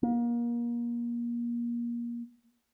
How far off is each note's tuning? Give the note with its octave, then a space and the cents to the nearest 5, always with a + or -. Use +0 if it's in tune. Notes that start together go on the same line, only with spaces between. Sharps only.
A#3 +30